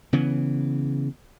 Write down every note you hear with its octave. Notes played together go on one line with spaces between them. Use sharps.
C#3 E3 B3